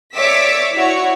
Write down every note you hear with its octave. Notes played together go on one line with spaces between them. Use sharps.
C#5 D5 E5 D6 E6 B6
E4 F#4 C#5